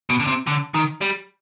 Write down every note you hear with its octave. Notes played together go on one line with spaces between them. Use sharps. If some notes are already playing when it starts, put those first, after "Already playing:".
B2
D3
C3
D3
D#3
G3